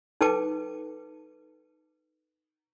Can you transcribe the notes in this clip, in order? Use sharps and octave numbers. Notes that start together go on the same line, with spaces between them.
D#4 A4 B4 G5 A5 D6